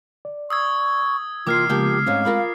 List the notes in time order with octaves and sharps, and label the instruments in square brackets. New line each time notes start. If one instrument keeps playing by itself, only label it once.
[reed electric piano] D5
[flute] C#6 [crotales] D#6 E6 G#6
[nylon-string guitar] C3 A#3 [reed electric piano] E3 [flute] F4 [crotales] D6 F6 C7
[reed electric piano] C#3 G#3 B3 [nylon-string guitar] F3 A#3 G5 [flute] G4
[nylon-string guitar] G#2 C#4 D#4 [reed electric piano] G#3 A3 C4 [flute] F5
[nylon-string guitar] F4 A#4 B4